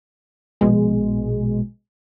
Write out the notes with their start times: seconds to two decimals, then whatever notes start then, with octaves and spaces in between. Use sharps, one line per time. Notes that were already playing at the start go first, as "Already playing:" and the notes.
0.61 A#1 B2 G#3